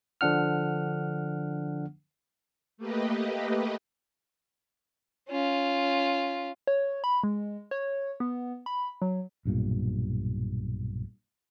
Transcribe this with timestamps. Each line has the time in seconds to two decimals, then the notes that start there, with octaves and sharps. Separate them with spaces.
0.21 D3 F3 D4 F#5 F6
2.77 A3 A#3 G4 B4 D#5
5.29 C#4 F4
6.67 C#5
7.04 B5
7.24 G#3
7.71 C#5
8.20 B3
8.66 B5
9.02 F#3
9.45 B1 G2 A#2